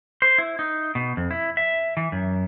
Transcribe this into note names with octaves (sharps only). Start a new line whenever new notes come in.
C5
E4
D#4
B2
F2
E4
E5
E3
F#2